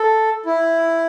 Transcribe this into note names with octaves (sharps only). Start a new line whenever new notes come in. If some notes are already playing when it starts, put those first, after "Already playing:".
Already playing: A4
E4